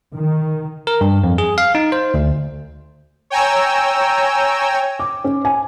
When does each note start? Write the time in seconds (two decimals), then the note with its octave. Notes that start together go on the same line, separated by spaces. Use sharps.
0.14 D#3
0.87 A#4
1.01 G2
1.24 F2
1.38 G#4
1.58 F5
1.75 D#4
1.92 C5
2.14 D2
3.30 C#5 G5 G#5 A#5 E6
4.99 D6
5.24 C#4
5.45 G#5